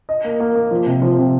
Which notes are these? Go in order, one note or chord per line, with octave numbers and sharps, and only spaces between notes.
D#5
A#3
A#3
A#3
F3
C3
F3
C3